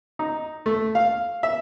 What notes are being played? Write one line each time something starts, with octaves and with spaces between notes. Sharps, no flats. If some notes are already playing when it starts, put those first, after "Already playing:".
D#4
A3
F5
E5